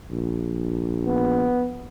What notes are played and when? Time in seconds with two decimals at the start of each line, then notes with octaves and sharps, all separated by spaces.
0.11 A#1
1.07 B3